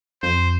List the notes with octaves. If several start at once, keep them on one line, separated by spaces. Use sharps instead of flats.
F2 C5